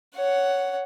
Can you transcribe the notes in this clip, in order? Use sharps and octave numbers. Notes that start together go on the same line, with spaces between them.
C#5 F#5